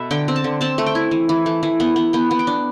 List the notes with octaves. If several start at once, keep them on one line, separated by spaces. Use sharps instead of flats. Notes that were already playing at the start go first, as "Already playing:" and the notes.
Already playing: B2 A4 B4 E5
D3 G5
C4
A5
D3
C4 A5
A3
G5
E4
E3
E3
A3
E3
B3
B3
B3 G5
B3
G5
D4